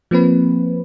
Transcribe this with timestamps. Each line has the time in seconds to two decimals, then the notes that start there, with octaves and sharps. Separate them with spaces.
0.11 F3 A#3 C4 B4